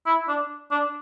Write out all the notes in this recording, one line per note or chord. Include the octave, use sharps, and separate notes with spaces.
E4
D4
D4